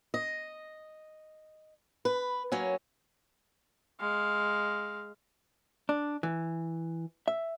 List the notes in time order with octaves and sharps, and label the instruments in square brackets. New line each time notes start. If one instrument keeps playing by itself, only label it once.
[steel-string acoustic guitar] D#5
B4
F#3 A#3 C#4
[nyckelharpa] G#3 F5
[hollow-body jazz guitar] D4
E3
E5